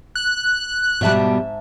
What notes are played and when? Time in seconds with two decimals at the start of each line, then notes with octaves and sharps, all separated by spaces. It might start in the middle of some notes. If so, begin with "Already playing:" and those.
0.15 F#6
1.01 G#2 B2 G3 E5 A5